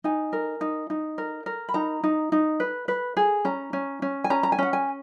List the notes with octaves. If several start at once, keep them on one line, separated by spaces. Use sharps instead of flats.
D#4 G#5
A#4
D#4
D#4
A#4
A#4
B5
D#4 A#5
D#4
D#4
B4
B4
G#4
C#4 A#5
C#4
C#4
G#5
C#4 A#5
A#5
G#5
C#4 F#5
G#5